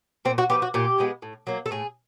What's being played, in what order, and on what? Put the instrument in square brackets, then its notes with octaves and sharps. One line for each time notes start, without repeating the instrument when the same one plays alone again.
[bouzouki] A#2 C4
F#4
F3 G#3 B3 G4
F#4
A#2 G4
F3 G#3 B3
A2
F#3 A#3
A4
A2 G#4